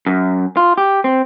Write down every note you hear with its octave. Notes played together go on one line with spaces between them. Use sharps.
F#2
F4
G4
C4